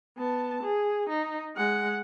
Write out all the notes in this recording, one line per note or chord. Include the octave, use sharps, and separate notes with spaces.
B3 A5
G#4
D#4
G#3 F#5